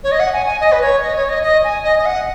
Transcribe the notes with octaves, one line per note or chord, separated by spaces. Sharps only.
C#5
D#5
F#5
G#5
G#5
D#5
B4
C#5
D#5
C#5
D#5
D#5
G#5
D#5
D#5
F#5